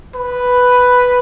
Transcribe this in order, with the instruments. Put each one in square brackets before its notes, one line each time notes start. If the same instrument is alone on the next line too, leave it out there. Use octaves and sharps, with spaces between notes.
[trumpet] B4